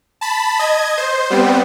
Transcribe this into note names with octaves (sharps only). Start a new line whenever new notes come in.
A5 B5
D#5 G#6
C5
G3 B3 C4